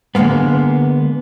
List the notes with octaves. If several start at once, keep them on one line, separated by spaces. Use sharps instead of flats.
D3 F3 G#3 A#3 B3